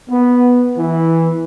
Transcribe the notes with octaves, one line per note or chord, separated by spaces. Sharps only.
B3
E3